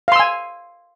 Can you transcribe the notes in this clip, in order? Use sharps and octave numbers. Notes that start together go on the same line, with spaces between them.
F5 G#5 C6 E6